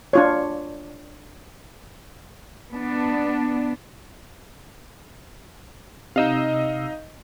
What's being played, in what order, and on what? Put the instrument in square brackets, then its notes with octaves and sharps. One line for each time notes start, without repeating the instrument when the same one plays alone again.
[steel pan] D4 F4 C#5
[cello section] B3 D4
[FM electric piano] C3 E6 [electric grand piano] D#4 D#5 F5